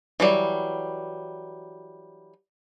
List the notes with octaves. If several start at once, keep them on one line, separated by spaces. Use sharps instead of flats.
E3 F#3 G3